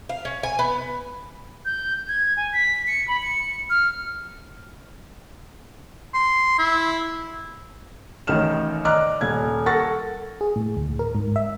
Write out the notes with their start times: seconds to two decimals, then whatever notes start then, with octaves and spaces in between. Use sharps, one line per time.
0.09 F5
0.25 C#4
0.43 G#5
0.59 B3
1.65 G6
2.08 G#6
2.37 G#5
2.53 B6
2.87 C#7
3.08 B5
3.22 C#7
3.70 F6
6.14 C6
6.59 E4
8.27 A1 D#3 D#4 C#5 F6 E7
8.85 D5 D#5 A#5 D6 F6 F#6
9.21 D#1 G#6
9.66 A4 A#4 F#5 C#6 A6 A#6
10.41 G#4
10.56 A2
10.77 D2
10.99 A#4
11.15 G#2
11.36 E5